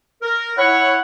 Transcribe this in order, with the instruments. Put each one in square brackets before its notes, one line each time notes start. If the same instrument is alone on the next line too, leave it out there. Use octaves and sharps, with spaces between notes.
[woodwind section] A#4
[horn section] E4 F#5 [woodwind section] C#5